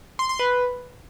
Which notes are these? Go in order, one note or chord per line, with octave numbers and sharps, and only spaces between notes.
C6
C6
B4